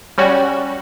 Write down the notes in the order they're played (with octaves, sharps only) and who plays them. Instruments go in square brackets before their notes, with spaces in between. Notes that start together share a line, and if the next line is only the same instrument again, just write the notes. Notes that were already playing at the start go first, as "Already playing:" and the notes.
[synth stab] G3 C#4 F#4